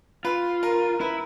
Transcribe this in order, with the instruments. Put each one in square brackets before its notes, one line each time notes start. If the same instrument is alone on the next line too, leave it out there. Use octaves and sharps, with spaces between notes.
[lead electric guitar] F4 [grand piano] B4
[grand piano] A#4
[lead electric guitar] E4 [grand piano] B4